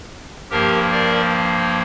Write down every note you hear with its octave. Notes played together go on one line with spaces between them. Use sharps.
G2 F3 A#3 G4 A#4
A#4 D5